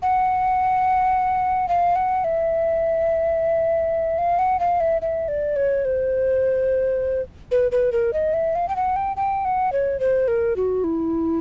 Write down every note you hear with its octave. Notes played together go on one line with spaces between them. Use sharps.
F#5
F5
F#5
E5
F5
F#5
F5
E5
E5
D5
C#5
C5
B4
B4
A#4
D#5
E5
F5
G5
F#5
G5
G5
F#5
C#5
C5
A#4
F#4
E4